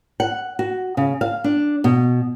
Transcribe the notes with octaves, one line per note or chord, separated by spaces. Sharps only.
F#5
F#4
C#3
F5
D4
B2